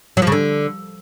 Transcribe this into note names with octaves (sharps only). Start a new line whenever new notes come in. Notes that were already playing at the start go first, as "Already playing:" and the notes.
F#3
F3
C#3
D3